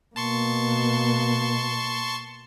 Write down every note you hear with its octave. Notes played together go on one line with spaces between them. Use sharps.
B2 A#3 A5 C6 C#6